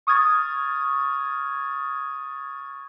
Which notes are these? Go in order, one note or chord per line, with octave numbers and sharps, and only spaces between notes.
C#6 D#6 F6 G#6 A6